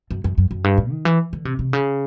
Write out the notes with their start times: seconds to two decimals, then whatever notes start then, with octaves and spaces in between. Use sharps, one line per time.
0.11 F#2
0.24 F#2
0.38 F#2
0.51 F#2
0.64 G2
0.78 A2
0.91 D#3
1.05 E3
1.33 D3
1.45 C3
1.59 C3
1.73 C#3